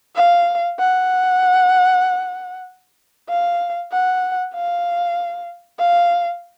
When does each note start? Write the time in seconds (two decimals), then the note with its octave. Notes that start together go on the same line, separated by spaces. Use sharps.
0.15 F5
0.79 F#5
3.29 F5
3.91 F#5
4.54 F5
5.79 F5